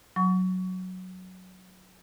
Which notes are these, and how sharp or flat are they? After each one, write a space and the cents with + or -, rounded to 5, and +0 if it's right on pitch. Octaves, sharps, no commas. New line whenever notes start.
F#3 +0 C#6 +25